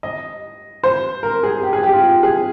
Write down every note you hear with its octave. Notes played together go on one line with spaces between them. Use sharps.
D#5
C5
A#4
G#4
G4
G#4
G4
F4
G#4